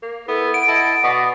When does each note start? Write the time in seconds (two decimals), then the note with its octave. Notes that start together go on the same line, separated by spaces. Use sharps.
0.02 A#3
0.28 B3 E4 A4
0.54 F#5 D7
0.68 E4 A4 D#5 A5
1.04 B2 D5 D#5